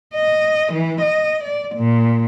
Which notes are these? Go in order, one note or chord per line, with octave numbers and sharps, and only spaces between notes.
D#5
E3
D#5
D5
A#2